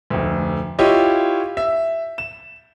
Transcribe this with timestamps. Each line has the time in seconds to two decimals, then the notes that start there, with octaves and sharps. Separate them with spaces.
0.10 F1 D2
0.79 E4 F4 G4 C#5 D#5
1.57 E5
2.18 E7